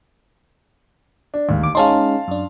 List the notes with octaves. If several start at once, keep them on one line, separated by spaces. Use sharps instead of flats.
D4
A1 D#2 G#2
D2 D6
G#3 C#4 D#4 F5 A5 C6
F#2 D4